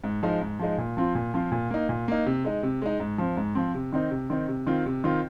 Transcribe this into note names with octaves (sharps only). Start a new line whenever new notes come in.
G#2
F3 G#3 D#4
G#2
F3 G#3 D#4
A#2
F3 C4 F4
A#2
F3 C4 F4
A#2
A#3 D#4
A#2
A#3 D#4
C3
G#3 D#4
C3
G#3 D#4
G#2
F3 C4
G#2
F3 C4
C3
D#3 C4 D#4
C3
D#3 C4 D#4
C3
D#3 C4 F4
C3
D#3 C4 F4